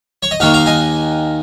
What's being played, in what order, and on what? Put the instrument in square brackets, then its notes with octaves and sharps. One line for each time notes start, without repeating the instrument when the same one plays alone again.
[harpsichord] C#5
D#5
D#2 D#3 A#3 C#5 F5
F5 A#5
D#5 G#5